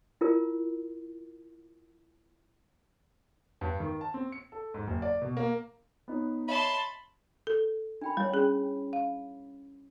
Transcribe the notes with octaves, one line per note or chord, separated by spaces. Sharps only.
E4 F4 A#4
G2
D#3
A5
C4
C#7
A4
G#2
F#1
D5
B2
A#3
B3 D#4 C#5
C#5 D#5 E5 A5 B5 C6
A4
D4 G5 B5
G3 E4 C#5
C#4 G#4
F5